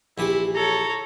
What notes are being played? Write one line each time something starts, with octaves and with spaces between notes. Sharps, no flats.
A#1 E3 E4 G4
A4 C#5 A#5